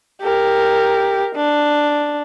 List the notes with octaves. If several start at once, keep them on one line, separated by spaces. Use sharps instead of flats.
G4 A#4
D4